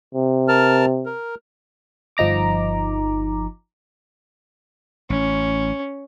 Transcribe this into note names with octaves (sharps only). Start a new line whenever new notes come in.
C3
A#4 A5 F6
A#4
G1 F3 D#4 A#5 D6
A1 C#4